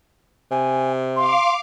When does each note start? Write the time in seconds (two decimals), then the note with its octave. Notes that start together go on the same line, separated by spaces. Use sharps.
0.51 C3 G#5
1.16 F5 C6 D6